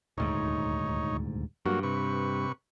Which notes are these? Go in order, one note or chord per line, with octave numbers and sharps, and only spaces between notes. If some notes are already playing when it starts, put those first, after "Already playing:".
D#1 D2 G#2 D#4 C#5
G2 F#3 A#3 F#4
C3 B4 C#6